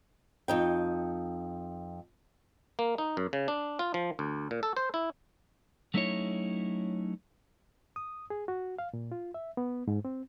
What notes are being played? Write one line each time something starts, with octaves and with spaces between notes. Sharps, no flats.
F2 D#4 G5
A#3
D#4
F#2
C#3
D4
F4
F3
D2
A#2
A4
C5
E4
F#3 A3 C#4 D#4 E4 C#5
D#6
G#4
F#4
F5
A#2
F4
E5
B3
G#2
C4